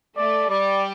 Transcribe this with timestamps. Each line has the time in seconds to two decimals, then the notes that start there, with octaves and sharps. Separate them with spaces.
0.17 A3 D5
0.50 G3 D5